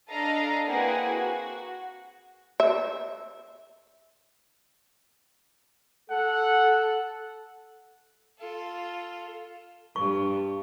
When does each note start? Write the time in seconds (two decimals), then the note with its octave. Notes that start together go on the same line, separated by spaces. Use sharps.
0.10 D4 A4 D#5 F5 A#5
0.67 A#3 C4 E4 G#4 B4 F#5
1.10 F#4
2.60 E5
6.10 A4 F#5
8.39 F4 A4
9.96 G2 C#6